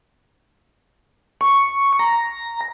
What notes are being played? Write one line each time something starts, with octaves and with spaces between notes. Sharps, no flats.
C#6
A#5